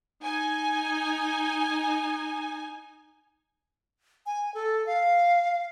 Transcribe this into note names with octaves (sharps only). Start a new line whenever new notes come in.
D#4 G#5
G#5
A4
F5